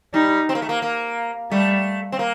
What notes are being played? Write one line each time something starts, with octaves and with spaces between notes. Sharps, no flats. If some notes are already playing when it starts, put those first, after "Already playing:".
G3 D#4
C4
A#3
A3
A#3
A#3
G3 A3
C4
A#3